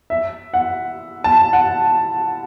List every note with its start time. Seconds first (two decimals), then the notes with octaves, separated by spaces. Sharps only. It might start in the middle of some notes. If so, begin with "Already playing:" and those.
0.10 E5
0.54 F#5
1.24 A5
1.53 F#5